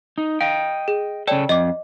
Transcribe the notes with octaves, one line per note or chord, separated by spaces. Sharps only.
D#4
D#5 F5 G5
G#4
C#3 A4 C#5 D5 G5
F2 D#5 D6